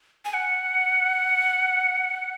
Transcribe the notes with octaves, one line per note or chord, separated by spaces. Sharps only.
G#5
F#5